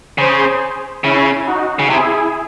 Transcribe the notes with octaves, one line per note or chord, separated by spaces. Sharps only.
C#3 G#4 C5
C#3 C#4 E4
D#4 F#4
C#3
C3 E4 G#4